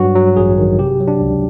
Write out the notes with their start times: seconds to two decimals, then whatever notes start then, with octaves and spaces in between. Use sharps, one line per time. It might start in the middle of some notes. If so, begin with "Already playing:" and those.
Already playing: G2 F#3 F#4
0.16 F#3
0.36 A1 G#4
0.58 D#3
0.79 C3 G4
1.00 F#3
1.08 D4
1.21 C#2